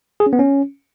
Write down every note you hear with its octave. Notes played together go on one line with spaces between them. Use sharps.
G#4
C#4
B3
C#4